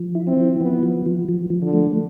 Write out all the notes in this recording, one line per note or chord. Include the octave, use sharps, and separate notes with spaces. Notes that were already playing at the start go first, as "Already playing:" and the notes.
Already playing: F3
E4
C4
F3
F3 B3
F3
F3
F3
F3
D3
A3